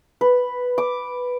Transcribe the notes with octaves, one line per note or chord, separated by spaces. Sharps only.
B4
D6